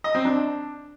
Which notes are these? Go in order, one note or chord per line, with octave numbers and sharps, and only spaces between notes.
D#5
C4
D4